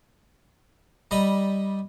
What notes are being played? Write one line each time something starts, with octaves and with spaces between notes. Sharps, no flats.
G3 D#5 A#5 B5